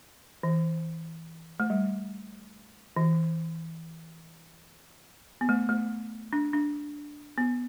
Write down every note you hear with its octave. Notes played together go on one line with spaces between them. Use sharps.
E3
A3
G3
E3
B3
A3
A3
D4
D4
B3